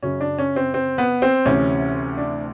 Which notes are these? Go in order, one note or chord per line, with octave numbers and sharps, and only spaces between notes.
F#2 C#3 F#3 C#4
D4
C#4
C4
C4
B3
C4
D2 C3 E3 C#4
D4